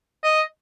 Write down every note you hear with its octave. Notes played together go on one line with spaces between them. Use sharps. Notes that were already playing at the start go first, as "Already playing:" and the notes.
D#5